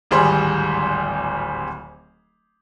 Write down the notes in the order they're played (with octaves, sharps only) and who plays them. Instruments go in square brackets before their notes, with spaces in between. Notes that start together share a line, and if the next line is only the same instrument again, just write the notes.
[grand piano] D1 G#1 G3 G#4 C5